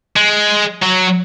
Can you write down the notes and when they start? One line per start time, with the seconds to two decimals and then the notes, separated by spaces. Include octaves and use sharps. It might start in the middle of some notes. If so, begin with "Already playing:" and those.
0.16 G#3
0.83 F#3